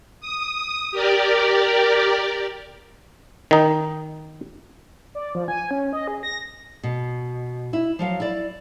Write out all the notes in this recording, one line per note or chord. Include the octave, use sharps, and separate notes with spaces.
D#6
G4 A#4 D5
D#3 D#4
D5
F3
G#5
C#4
D#5
G#4
A#6
B2
E4
F3 F#3 F5
E4 D5